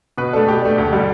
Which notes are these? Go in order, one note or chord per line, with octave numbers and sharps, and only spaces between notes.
B2 B4
A3 D4 A4
B2 G4
A3 D4
D2
D3 G3